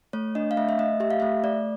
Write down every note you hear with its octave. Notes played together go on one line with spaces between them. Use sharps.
A3 C#5
D4 D#5
F5
A3 E5
E5
A3 D#5
G4 E5
F5
A3 E5
A3 D5